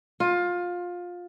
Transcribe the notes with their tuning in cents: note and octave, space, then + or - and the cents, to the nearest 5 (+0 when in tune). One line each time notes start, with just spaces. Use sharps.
F4 +20